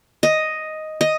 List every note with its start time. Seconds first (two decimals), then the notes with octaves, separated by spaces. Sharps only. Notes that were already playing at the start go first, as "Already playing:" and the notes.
0.23 D#5
1.01 D#5